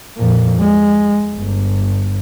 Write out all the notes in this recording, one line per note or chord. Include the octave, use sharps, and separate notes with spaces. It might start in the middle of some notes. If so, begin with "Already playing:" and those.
F2 A#2
G#3
G1